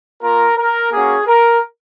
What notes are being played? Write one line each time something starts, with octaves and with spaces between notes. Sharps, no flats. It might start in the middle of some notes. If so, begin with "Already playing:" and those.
A#3 F4 A#4
A#4
A#3 C#4 F#4 G#4
A#4